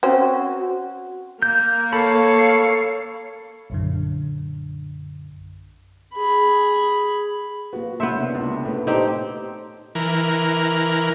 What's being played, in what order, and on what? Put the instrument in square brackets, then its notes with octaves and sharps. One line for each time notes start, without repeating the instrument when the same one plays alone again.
[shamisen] C4 C#4 [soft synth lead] F#4
[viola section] A#3 [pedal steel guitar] G6
[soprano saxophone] A4 [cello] C#5 F5 [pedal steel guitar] B5
[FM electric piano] A#1 F#2 D3
[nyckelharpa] G#4 B5
[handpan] A#3 F4 B4 [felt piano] F#4
[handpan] A#3 C#4 E4 [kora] B3 E5 [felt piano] C6 G6 C#7
[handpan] C3 A#3 D4
[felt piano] C#2 [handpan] D4
[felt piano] A2 [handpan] A4 B4
[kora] C4 D#4 G4 [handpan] A4 C5 D5
[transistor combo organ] E3 A#4